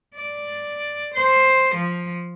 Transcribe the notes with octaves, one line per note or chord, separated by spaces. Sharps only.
D5
C5
F3